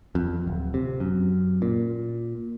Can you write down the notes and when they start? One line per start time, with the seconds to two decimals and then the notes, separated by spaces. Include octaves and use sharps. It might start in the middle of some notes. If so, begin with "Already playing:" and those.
0.15 F2
0.47 D1
0.74 C3
1.00 F#2
1.62 A#2